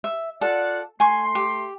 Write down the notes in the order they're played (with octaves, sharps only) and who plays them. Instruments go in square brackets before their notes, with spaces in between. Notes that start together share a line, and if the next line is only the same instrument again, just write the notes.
[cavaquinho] E5
[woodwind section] F4 D5 F#5 [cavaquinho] A4
[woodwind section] A3 C6 [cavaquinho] G#5 C#6
[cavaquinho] G4